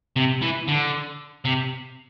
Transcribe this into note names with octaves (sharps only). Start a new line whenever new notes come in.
C3
E3
D3
C3